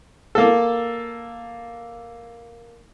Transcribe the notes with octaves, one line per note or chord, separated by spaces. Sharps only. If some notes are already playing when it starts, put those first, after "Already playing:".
A#3 A4